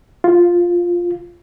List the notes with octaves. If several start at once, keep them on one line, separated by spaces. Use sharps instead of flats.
F4